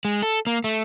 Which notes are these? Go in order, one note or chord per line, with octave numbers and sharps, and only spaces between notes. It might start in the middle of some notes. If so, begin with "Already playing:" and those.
G#3
A4
A#3
A3